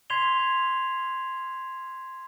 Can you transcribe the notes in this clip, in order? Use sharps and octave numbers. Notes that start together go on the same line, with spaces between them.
C6 G#6 B6 C7 F7 G7